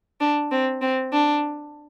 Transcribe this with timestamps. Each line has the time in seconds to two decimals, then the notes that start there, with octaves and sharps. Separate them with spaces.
0.21 D4
0.51 C4
0.82 C4
1.13 D4